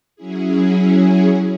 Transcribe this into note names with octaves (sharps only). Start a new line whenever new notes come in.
F#3 C#4 E4 G#4